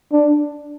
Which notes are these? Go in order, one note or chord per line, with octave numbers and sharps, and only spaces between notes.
D4